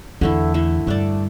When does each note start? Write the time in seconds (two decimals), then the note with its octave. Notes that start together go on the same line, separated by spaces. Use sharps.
0.21 E2 D3 A3 E4
0.54 D3 A3 E4
0.87 G2 A3 D4 A4 D5